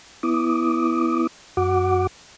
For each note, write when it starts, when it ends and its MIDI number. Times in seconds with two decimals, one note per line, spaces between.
0.23 1.27 59
0.23 1.27 64
0.23 1.27 86
0.23 1.27 87
1.57 2.07 42
1.57 2.07 66
1.57 2.07 78
1.57 2.07 86